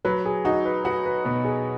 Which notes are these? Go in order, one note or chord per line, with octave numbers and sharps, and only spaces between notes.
F#3 B4
G#4
D#4 F#4
B4
F#4 B4
B4
B2 B4
G#4